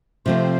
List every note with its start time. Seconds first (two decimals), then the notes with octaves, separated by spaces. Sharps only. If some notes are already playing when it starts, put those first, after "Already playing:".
0.25 C3 F3 A3 C4 C5